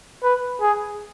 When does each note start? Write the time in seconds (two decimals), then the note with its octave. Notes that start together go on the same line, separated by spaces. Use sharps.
0.23 B4
0.61 G#4